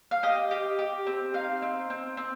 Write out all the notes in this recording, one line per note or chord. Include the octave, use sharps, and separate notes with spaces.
F5
G4 D#5
G4
G4
C4
D#4 F5
C4
C4
C4